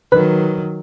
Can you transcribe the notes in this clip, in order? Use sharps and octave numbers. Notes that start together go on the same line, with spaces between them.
D#3 F#3 B4